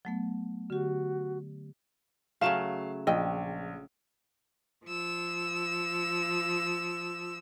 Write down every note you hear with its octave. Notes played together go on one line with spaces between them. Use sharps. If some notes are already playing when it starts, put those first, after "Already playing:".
F#3 A3 B3
D3 F#4 G4
C#3 F#3 A3 F5 E7
A#1 D#5 G5
F3 E6